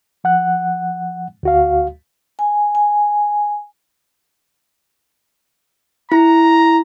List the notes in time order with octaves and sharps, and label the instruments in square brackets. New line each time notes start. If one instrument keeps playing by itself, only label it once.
[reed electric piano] F3 F#5 F#6
D2 F#4 F5
[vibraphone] G#5
G#5
[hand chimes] E4 [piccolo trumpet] A#5